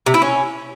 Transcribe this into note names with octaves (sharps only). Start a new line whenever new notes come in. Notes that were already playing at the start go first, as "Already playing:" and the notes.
C3
E4
C#4